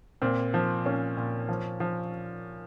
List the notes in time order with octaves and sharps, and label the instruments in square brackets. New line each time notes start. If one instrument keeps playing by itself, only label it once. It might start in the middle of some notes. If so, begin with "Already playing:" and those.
[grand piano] A#2 C4
F3
A#2 C#4
A#2
F3
F3